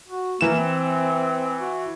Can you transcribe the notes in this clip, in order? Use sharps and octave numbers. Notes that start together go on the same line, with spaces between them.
F#4
E3 A#3 E7
C4
F#4